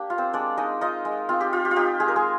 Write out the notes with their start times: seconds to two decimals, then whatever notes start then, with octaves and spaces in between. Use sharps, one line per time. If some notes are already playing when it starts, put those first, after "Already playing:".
Already playing: A#3 D4 G4
0.10 F4
0.18 C4 C5
0.33 G#3 D4 D5
0.57 G#3 D#4 D#5
0.81 D#4 F4 D#5
1.05 G#3
1.29 C4 F4
1.41 G4
1.53 F4
1.65 G4
1.71 F4
1.76 D#4 G4
2.00 G#3 G#4
2.08 A#4
2.16 G#3 G#4